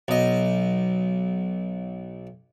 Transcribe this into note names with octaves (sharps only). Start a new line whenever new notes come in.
B1 D#5